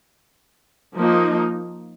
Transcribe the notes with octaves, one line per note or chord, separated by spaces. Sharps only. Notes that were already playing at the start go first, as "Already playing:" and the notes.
F3 A#3 D#4